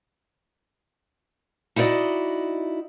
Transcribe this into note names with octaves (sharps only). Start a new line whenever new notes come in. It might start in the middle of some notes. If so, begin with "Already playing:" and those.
D#4 E4 F#4 C5 D5 D#5